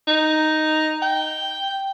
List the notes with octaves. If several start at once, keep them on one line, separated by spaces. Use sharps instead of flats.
D#4
G5